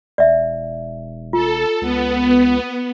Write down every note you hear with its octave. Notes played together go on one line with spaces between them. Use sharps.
E1 D5 E5
F4 A4
C#2 B3